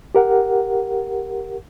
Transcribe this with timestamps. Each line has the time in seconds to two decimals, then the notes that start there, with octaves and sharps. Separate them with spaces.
0.15 G4 A#4 F#5